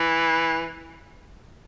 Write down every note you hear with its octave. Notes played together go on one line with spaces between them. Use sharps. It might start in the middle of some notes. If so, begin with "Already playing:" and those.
Already playing: E3